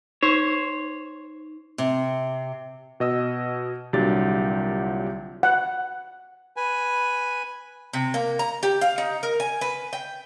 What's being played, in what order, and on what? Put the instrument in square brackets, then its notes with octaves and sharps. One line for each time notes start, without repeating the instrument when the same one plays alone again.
[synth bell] D#4 [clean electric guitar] C5 C#5
[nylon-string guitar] C3
[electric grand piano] B2 D#5 E6
C2 A#2 D3 F#3 G4 A6
[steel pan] F#5
[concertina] B4 G#5
[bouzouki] C3
A#3
A#5
G4
F5
D#4
A#4
G#5
B4
G5